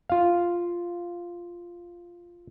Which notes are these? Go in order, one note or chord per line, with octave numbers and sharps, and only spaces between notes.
F4 F5